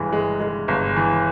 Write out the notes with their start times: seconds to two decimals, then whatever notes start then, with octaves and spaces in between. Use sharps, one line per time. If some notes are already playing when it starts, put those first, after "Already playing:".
Already playing: G1 G2 E3 G#3
0.13 G#3
0.40 G#3
0.68 G1
0.96 E3